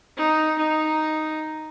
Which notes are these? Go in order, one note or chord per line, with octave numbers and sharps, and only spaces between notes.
D#4
D#4